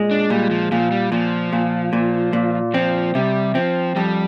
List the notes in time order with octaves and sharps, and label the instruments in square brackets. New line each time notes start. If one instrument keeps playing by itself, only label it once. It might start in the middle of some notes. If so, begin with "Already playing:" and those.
Already playing: [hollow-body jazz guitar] A#2 G#3
[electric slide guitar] D4
[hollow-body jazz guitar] A#2 [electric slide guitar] G3
[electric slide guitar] F3
[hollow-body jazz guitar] A#2 [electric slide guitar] F3
[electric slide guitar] G3
[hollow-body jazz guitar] A#2 [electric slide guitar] F3
[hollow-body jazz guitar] A#2
A#2
A#2
[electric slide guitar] F3 [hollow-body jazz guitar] C4
[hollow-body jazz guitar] C3 [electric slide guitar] G3
[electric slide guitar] F3 [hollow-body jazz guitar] C4
[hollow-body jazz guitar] F2 [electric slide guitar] G3